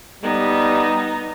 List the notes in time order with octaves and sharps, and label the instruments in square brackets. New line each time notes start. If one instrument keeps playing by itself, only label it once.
[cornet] G3 [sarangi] B3 [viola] D#4